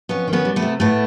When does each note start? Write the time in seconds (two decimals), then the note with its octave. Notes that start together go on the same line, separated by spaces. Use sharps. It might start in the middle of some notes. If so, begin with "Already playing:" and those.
0.09 F2 B3 C#4
0.28 D#3
0.33 B3 C#4
0.45 G3
0.56 A3 B3
0.62 C3
0.80 A2 A3 B3